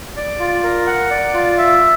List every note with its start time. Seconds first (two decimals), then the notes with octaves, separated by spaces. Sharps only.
0.17 D5
0.40 F4
0.63 A#4
0.87 F#5
1.11 D5
1.34 F4
1.58 E5